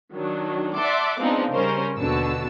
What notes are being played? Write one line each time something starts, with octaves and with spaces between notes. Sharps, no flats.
D#3 F#3 D4
D5 E5 F#5 A5 C6 D6
F3 G#3 B3 C4 D4 D#4
C#3 G3 C#4 A#4 C5
D#2 B2 D3 F#4 A5 E6